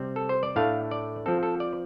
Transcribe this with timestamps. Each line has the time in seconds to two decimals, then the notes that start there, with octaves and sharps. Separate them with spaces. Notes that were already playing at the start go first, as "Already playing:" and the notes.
Already playing: C3 G3 C4
0.16 A4
0.29 C5
0.43 D5
0.56 A2 A3 D4 F5
0.91 D5
1.26 F3 C4 A4
1.43 A4
1.60 D5